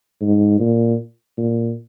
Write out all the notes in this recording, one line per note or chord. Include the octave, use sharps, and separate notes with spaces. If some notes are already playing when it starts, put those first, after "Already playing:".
G#2
A#2
A#2